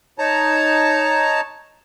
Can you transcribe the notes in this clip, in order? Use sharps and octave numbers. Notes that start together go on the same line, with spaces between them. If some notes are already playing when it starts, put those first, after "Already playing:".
D#4 C#5 A5 A#5